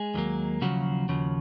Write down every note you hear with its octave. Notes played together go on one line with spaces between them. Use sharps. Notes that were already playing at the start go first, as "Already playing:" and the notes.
Already playing: G#3 G#4
D#2 D#3 F#3 A#3
D#2 C#3 F3 F#3 F#4
D#2 C#3 F3